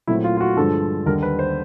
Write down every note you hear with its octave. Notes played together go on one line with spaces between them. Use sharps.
A#2 F#3 A3 C4 E4
F4
F4
F#4
G2 D3 F3 G#3 A4
D#2 D3 G3 A#4
B4
C5